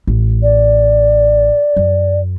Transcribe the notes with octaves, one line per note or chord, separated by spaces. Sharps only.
A1
D5
F#2